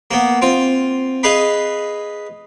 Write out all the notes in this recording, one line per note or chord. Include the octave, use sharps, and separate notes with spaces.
A#3 B3
C4 F4
G#4 B4 D#5 F5 B5